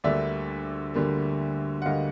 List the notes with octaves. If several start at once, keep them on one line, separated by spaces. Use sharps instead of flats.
D2 D3 G3 A#3 D5 E5
D2 D3 G3 A#3
F#5
D2 D3 G3 A#3 D#5 F5